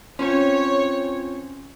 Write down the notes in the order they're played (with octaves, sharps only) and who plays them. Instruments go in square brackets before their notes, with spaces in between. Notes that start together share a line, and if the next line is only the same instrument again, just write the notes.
[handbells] C4 F4 C5 [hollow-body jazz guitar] C#4 [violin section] C#5